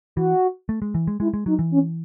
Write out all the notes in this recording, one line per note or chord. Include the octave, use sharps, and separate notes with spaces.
E3 F#4
A3
G#3
E3
G#3
G#3 E4
G#3
F#3 D#4
E3
C#4